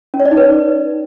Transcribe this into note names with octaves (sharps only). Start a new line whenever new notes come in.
C#4
C#5
D5
D#4
B4